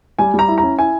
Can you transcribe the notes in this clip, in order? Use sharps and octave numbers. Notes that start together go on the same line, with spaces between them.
G3 G#5
G3 A#5
E4
A#5
C#4
E4 G#5